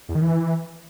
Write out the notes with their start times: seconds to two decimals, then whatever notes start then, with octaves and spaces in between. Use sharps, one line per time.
0.09 E2
0.15 D#3
0.21 E3